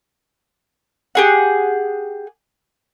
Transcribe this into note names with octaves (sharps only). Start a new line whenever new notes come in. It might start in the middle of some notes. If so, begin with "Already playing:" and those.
G4 G#4 F#5